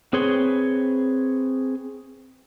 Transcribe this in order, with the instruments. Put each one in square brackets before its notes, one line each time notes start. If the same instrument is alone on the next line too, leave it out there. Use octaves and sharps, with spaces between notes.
[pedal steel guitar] C4 G#4 B4 C#5 C6